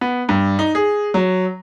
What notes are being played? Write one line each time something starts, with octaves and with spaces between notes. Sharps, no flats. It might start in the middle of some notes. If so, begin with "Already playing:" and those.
B3
G2
D#4
G#4
F#3